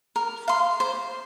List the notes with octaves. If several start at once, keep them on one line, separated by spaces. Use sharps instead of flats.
A#4
F5 C6
C5